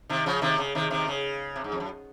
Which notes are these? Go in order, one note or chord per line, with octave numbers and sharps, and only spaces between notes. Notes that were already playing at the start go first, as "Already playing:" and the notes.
C3 D#3
C#3 F3
C3 D#3
C#3
C3 D#3
C3 D#3
C#3
C3
G#2
F2
F#2